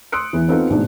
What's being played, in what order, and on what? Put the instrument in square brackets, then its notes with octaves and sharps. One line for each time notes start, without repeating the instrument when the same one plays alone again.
[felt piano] C6 D#6 E6 F#6 C#7 D7
E2 E3
B3 C4 D#4 F4 A4
A1 G#2 B2 D4